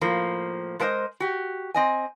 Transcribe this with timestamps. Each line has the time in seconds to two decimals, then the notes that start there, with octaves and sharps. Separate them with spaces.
0.01 A2 F3 A#3
0.79 G#3 A3 A#4 C5 D#5
1.20 F#4 G4
1.74 C4 D#5 G#5